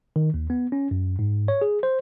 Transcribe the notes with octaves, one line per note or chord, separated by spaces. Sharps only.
D#3
D#2
B3
C#4
F#2
G#2
C#5
G#4
C5